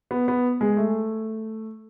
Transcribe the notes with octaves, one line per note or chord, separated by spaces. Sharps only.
B3
B3
G#3
A3